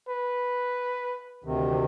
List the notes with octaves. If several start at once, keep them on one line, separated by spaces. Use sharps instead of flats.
B4
D2 C3 D#3